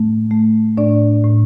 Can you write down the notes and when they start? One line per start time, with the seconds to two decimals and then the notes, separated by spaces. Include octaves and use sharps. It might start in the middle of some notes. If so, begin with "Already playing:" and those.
Already playing: A2 A3
0.31 A3
0.77 A2 D4 D5
1.24 A2